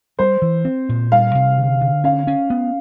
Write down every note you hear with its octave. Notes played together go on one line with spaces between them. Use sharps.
G3 C5
E3
C4
A#2
G3 F5
C3
D3
D3
C#4 F5
C#4
B3